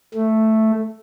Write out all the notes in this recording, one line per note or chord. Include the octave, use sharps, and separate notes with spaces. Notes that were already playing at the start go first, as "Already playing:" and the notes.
A3